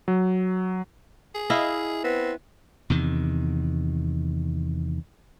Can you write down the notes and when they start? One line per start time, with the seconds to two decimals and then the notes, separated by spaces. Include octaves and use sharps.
0.08 F#3
1.35 G#4
1.50 E4 D#5 F5
2.04 B3 C4
2.90 E2 C3 D#3